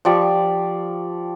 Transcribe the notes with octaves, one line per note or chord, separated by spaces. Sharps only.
F3 G4 D5 C#6